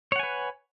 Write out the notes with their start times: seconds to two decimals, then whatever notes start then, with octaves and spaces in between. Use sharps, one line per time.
0.12 C#5
0.16 F#5
0.19 G#5
0.23 B4